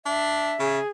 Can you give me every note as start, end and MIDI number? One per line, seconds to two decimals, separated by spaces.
0.06 0.54 62
0.06 0.79 76
0.59 0.79 49
0.59 0.88 68